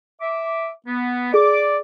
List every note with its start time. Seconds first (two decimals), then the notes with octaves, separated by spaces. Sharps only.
0.21 E5 D6
0.87 B3
1.34 G#4 D5 D6